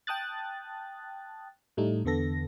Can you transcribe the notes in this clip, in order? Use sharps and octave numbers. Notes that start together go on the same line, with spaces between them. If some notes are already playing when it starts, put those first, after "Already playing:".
G5 A5 D#6 F#6 A6
A2 G3 A3 D#4
E2 D3 B3 A4 A#6